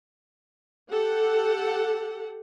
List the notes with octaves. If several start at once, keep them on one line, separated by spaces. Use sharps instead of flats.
G4 A4 F#5